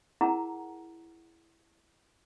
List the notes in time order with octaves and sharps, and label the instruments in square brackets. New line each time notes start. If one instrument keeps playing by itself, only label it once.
[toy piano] E4 G#4 A#4 F#5 A5 A#5